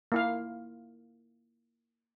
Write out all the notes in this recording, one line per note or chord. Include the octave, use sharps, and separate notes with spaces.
A#3 E4 F5